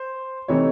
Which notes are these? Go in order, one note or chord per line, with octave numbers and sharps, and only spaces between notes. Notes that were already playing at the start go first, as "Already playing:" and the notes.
Already playing: C5
C3 E3 A3 C4 D#4 C#5